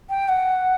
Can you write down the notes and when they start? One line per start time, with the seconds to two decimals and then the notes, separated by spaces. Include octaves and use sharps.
0.10 G5
0.29 F#5